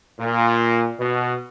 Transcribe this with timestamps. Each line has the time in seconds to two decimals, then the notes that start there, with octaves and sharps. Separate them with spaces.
0.18 A#2
0.99 B2